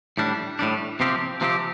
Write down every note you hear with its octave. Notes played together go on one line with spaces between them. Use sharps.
A2 G3 D4
A2 G3 D4
C3 F3 C4 G4
C3 F3 C4 G4